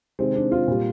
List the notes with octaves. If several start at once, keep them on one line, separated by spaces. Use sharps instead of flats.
C3 D#3 G#3 C4
D4
F4
A#2 G3